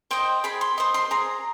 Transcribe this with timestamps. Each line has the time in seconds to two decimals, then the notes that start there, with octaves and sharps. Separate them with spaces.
0.11 C5 D#5 G5
0.44 G#4 B5
0.61 C6
0.78 C5 D#5 C6
0.94 C6
1.11 G#4 A#5